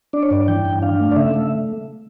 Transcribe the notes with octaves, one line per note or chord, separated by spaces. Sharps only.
D4 D5
C#5
G2 D5
E3 G5
G2
D4 F5
A3
D5
C#3 E5
A3